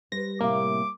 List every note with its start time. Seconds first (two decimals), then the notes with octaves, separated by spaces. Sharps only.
0.12 G3 B4 C5 A#6
0.41 A2 C3 A#3 F5 D6